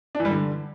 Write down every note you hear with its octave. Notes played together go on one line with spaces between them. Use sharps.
D4
E3
G3
D3